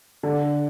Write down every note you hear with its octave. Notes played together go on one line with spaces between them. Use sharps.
D3